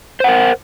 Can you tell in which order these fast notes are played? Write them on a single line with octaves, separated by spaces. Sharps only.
C5 F#5 A#4